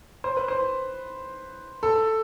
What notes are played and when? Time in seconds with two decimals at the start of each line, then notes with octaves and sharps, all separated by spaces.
0.24 C5
0.37 B4
0.48 C5
1.83 A4